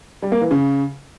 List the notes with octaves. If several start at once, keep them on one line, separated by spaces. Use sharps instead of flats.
G3
A#3
E3
C#3